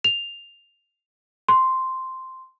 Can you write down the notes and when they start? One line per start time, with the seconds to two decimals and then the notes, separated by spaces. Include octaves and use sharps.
0.04 F7
1.49 C6